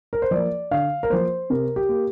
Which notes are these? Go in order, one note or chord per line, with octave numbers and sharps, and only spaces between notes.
A#4
C5
F3 A#3 D5
D3 F5
A#4
F3 A#3 C5
C3 A#4
G4
A#3